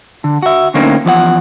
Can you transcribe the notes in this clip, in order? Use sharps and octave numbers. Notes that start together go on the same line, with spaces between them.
D3
F#4 E5
D3 A3 A#3 C4 C#4 D#4
E2 F3 D5 F#5